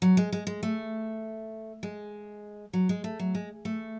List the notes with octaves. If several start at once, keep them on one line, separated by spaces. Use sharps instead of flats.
F#3
G#3
G#3
G#3
A3
G#3
F#3
G#3
A3
F#3
G#3
A3